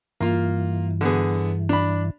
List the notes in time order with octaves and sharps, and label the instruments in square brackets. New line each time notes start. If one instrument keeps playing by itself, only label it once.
[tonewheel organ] G2 E3 [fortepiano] A#3 F4
[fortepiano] D3 B3 G#4
D4 B5